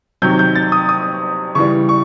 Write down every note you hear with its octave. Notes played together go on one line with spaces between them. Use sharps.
C3 D#3 F#3 G6
G6
A6
D#6
D#6
C#3 E3 G3 C#6
C#6